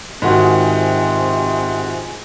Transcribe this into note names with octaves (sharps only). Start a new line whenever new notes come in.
G#2 C3 D#3 F4 F#4 G#4 G#5